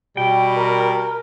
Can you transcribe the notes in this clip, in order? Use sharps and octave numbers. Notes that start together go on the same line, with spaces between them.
B2 G3 G5
A#4